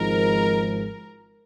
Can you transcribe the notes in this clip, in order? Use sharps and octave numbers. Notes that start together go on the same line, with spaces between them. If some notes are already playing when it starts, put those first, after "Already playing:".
Already playing: G#1 G#2 F3 G#3 A#4